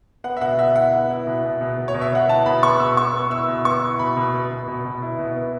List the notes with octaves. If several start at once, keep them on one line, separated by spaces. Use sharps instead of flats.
B3 F#5
E5
B2 F#5
B2 E5
E4 F#5
B3
E4
B2
B2
B2
B2
C#5
B2
E5
B3 F#5
E4 A5
B2 B5
B3 C#6
B2 E6
B3 C#6
B3
E4 E6
B2
B3 C#6
E4
B2 B5
B2
B2
B2
B2
B2
E4
B2
B3